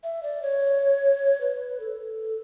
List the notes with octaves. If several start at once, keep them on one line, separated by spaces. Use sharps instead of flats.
E5
D5
C#5
B4
A4